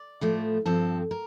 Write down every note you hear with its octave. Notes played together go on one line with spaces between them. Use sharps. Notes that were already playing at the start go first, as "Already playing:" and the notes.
Already playing: D5
A2 F3 A3
G2 F3 C4 A4
A#4